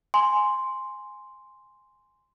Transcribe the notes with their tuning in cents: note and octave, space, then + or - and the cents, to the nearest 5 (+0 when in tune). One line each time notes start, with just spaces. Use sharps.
G#5 +0 C6 +0